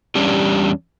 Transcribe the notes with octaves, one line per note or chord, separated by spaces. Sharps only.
E2 G3 C#4 D4 G4